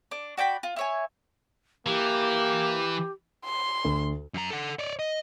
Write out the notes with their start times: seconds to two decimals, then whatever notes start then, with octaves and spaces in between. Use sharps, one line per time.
0.11 D4
0.37 F#4 D5 G5 B5
0.63 F4
0.76 E4 C#5 G#5
1.86 E3 A#3 G4
3.45 C6
3.85 D2
4.34 F#2 A#5
4.50 A4 F#5
4.79 C#5 D5
4.99 D#5